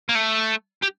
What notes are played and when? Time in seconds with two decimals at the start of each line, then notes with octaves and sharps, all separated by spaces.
0.09 A#3
0.15 A3
0.82 G4